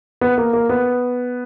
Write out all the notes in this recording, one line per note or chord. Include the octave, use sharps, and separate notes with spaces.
B3
A#3
A#3
B3